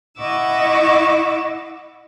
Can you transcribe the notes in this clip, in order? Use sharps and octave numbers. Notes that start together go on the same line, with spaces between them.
E4 D#5 F#5 C#6 D6 E6